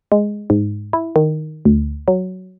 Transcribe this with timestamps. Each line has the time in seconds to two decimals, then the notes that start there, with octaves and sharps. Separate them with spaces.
0.12 G#3
0.50 G#2
0.93 E4
1.16 D#3
1.65 D2
2.08 F#3